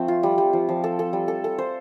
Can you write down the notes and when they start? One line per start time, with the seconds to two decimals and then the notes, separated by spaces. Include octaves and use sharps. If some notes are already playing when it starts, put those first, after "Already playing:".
Already playing: F3 A3 C4
0.08 F4
0.23 G3
0.38 G3
0.53 F3
0.69 F3
0.84 A4
0.99 A4
1.13 G3
1.28 A4
1.44 A4
1.58 C5